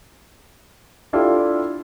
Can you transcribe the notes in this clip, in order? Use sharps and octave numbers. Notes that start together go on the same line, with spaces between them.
D4 E4 F4 G4 A4